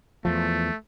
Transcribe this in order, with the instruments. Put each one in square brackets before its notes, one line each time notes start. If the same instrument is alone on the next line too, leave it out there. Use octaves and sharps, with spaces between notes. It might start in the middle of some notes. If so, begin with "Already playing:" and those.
[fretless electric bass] E2 F3 [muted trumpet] A3